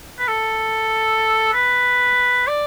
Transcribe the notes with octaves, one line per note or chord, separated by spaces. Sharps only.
B4
A4
B4
D5